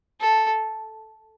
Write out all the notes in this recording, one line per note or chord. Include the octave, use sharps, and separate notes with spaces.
A4